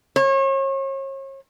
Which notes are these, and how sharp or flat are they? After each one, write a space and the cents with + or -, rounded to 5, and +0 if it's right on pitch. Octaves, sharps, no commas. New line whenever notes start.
C#5 -40